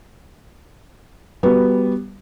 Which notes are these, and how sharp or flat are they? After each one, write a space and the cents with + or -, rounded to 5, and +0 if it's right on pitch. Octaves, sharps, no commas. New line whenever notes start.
G3 +0 B3 +0 F#4 +0